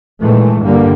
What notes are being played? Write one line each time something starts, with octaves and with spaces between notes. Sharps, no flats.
A#2 D#3 E3 G#3 A3
G2 D3 G3 A#3